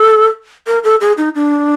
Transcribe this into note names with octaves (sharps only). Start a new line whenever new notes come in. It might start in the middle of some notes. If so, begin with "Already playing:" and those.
Already playing: A4
A#4
A4
G#4
D#4
D4